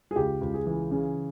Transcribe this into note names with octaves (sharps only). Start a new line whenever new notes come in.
G#4
C#2 G4
C#2
G#4
E3
C#3